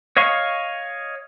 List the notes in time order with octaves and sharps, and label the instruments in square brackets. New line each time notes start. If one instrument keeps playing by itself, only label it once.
[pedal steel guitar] C#5 D#5 F5 C#6